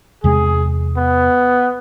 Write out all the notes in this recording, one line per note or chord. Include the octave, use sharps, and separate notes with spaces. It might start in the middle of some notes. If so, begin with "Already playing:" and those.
E2 C3 G#3 G#4
B3